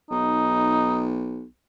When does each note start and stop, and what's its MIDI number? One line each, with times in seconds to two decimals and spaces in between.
0.11 1.43 35
0.11 1.06 63